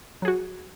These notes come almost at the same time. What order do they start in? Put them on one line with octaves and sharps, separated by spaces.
F#3 G#4 F#4